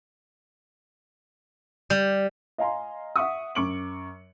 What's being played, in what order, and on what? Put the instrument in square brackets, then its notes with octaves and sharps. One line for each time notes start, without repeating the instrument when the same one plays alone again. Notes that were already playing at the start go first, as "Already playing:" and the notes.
[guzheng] G3
[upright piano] D#5 F5 G#5 A#5 C6
E5 F#5 C#6 D#6
F#2 C#6 D6 C#7 D7 F#7